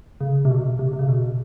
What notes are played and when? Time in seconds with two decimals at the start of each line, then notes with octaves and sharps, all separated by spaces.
0.21 C#3
0.45 C3
0.51 B2
0.79 C3
0.93 C3
0.99 C#3
1.09 B2